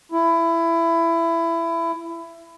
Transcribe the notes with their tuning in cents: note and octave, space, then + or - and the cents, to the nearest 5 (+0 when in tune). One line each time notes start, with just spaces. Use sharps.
E4 +20